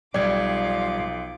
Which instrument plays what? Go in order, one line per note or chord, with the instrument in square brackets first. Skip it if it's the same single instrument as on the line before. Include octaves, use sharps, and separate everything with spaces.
[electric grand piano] B1 G#6 [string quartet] F3 D6 [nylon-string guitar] G3 [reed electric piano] D5